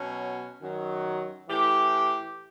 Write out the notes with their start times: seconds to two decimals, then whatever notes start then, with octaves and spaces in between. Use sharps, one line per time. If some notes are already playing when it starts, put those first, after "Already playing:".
Already playing: B2 F#3 C#4
0.60 F#2 D#3 F#3
1.48 A2 E3 G4